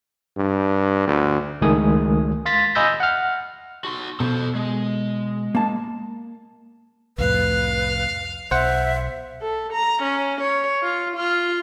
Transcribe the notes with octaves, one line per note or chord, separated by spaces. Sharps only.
G2
D2
C#2 D#3 G#3 A3 G#5 D#6
F5 C6 A6 B6
D#5 G#5 B5 E6 G6 A#6
F#5 F6
F#4 C6
B2 A4 C5
G#3
A#3 A5
C2 F2 A2 B4 F5
B1 C5 E5 F#5
A4
A#5
C#4
C#5
F4
F4